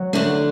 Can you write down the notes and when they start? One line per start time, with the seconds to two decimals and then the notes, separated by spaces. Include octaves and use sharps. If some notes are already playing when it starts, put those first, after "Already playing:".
Already playing: F#3
0.13 D3 A3 D4